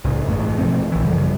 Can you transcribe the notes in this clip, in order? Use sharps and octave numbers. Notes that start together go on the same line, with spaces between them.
C2 A2 C#3
A1 G2 A3
B2 F3 A3 C4
A#1 E3
F#2 C#3 F3 G3